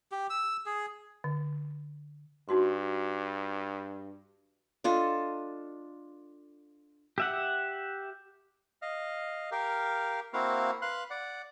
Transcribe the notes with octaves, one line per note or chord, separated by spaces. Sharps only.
G4
E6
G#4
D3
G2 D#4 F#4 C6
D4 F4 A4 D#5
G4 E5 F#5
D#5 F5
G4 A#4 F5
A#3 C4 E4 F#4 F5
B4 F5 C6 F#6
D5 F#5